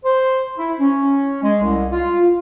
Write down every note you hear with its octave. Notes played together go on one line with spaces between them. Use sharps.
C5
E4
C#4
G#3
C2
F4